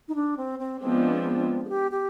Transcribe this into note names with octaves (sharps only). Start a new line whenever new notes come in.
D#4
D4
C4
C4
F3 G#3 B3 C4 D4
G#4
G4
G4